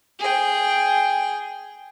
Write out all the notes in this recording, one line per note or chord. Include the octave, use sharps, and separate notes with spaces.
G#4 G5